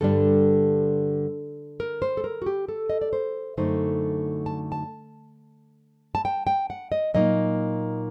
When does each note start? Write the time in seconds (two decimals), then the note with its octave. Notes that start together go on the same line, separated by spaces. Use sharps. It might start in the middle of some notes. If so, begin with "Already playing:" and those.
0.01 G2 D3 G3 D4 A4
1.80 A#4
2.02 C5
2.17 A4
2.24 A#4
2.42 F#4
2.46 G4
2.69 A4
2.90 D#5
3.01 D5
3.13 C5
3.57 F#2 D3 A3 D#4 C5
4.46 A5
4.72 A5
6.15 A5
6.25 G5
6.47 G5
6.70 F#5
6.92 D#5
7.14 A#2 F#3 A#3 D#4 D#5